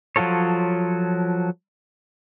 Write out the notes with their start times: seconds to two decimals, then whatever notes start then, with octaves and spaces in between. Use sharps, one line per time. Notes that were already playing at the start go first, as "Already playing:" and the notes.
0.16 F3 F#3 F4 A4 C#5